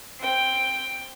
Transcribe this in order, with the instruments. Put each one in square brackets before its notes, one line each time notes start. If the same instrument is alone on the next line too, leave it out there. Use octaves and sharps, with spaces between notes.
[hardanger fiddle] C4 G5